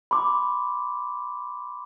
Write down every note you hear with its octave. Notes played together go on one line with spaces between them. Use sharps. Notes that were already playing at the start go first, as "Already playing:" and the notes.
B5 C6 D6